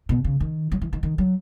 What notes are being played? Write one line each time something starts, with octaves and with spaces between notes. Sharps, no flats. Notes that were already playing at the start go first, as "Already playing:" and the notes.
B2
C#3
D#3
F#3
E3
D#3
D#3
F#3